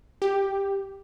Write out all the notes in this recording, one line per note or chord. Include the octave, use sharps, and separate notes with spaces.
G4